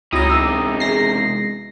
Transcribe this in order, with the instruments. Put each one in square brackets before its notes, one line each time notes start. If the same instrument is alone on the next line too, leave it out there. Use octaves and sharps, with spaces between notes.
[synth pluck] C#2 E4 A#6 [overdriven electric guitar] C3 D#4 [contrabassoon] F#3 [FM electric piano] D#5 D#6
[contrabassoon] E1 [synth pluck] D6 E6
[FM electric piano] G#3 A#6 C7